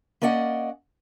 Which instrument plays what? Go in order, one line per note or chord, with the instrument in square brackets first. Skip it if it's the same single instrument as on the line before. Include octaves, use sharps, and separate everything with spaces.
[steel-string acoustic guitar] A#3 C#4 D5 D#5 F#5